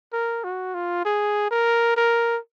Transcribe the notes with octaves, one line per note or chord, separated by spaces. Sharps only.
A#4
F#4
F4
G#4
A#4
A#4